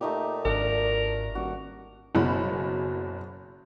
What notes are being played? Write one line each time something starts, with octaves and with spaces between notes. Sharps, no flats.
A#2 A3 D#4 G4
G#1 D4 A#4
D#1 F#4
F#1 F#2 B2 F#4 B5